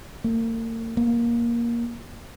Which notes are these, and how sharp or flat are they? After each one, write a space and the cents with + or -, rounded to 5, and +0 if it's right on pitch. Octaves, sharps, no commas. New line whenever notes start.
A#3 -40
A#3 +15